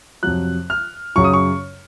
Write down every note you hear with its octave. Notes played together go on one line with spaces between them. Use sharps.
F2 C3 F#3 F#6
F6
F#2 C#3 F#3 C#6
D#6
C#6